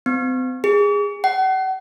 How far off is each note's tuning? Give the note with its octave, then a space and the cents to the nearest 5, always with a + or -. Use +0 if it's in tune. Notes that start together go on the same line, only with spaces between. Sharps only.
C4 -40
G#4 -20
F#5 +40